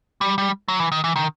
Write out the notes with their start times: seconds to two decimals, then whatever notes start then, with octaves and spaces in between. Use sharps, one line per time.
0.21 G3
0.38 G3
0.68 F#3
0.80 E3
0.92 D#3
1.04 E3
1.16 D#3